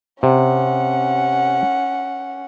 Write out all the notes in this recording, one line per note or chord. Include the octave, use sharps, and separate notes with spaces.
C3 C#4 F#5